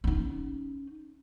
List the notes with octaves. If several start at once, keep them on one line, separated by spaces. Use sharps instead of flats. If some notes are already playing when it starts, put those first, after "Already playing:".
C#4 D#4